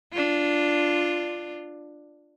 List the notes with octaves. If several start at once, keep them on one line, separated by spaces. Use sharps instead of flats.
D4 F4